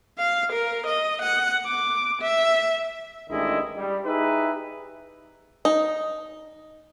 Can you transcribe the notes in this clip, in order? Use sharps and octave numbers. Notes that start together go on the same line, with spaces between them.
F5
A#4
D#5
F#5
D6
E5
A1 D#3 G#3 D4 E4 D#5
G3
D#4 E4 G4 G#4 B4 E5
D#4